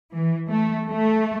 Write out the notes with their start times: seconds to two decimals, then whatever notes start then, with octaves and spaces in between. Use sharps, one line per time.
0.14 E3
0.50 A3
0.88 A3